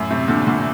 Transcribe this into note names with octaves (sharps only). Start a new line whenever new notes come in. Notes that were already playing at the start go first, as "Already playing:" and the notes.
Already playing: F#2 A2
A2 C3
A#2 D3
A#2 D3